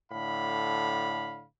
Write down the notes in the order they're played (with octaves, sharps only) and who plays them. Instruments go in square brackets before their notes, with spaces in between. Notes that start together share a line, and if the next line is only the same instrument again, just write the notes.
[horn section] A2 D3 F5 B5